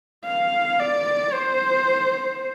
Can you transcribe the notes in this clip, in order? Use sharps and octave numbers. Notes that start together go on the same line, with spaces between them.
F5
D5
C5